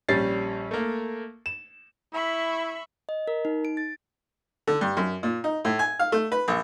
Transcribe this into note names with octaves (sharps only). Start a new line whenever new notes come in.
A#1 G3 C#4 A6 C7
A3 A#3
E7
E4 E5 B5 C#6
D#5
A#4
D#4
D7
A6
D3
G2
F#2
A#2
D#4
A2
G#5
F5
A3
B4
A#1